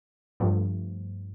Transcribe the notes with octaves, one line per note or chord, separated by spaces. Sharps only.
G2 F3 A3